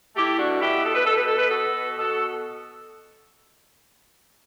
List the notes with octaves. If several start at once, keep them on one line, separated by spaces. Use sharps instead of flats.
A3 E4 G4
D4 F#4
B2
E4 G4
B2
A4
B4
B2 A4
B4
A4
B2 B4
F#4 A4
B2
B2 F#4 A4